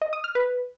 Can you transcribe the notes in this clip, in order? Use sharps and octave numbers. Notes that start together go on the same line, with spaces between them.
D#5
D#6
F6
B4